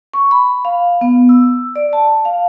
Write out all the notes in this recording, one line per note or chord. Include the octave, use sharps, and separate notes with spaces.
C#6
B5
F5
B3
E6
D5
A5
F5